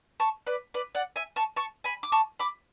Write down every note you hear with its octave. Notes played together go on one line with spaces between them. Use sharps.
A5 C#6
B4 D5
B4 D5
D5 F#5
E5 G#5
A5 C#6
A5 C#6
G#5 B5
D6
A5 C#6
B5 D6